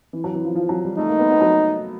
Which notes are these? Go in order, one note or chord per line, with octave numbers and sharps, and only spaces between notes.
E3
F#3
E3
F3
F3
F#3
G3
A3 D#4
A#3
B3
B3
F#3